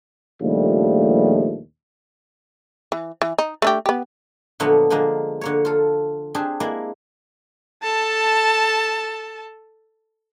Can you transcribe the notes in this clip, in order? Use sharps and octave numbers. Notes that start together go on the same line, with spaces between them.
A#1 D#2 C#3 F3 G3 A3
E3
E3
D#4
A3 D4 G4
B3 G4
A#2 D3 F3 F#3 A3 B3
D3 F3 G#3 A#3
D3 A#3 C#5
F4 A4
C4 D4 G4 G#4
G#3 A#3 E4 D5
A4 A5